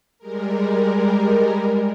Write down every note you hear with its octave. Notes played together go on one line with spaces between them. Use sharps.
G3 G#3 A#4